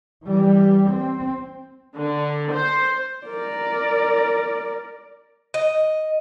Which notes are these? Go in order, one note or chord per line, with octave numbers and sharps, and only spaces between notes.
E3 G3
C4
D3
C5
A#4 D5
D#5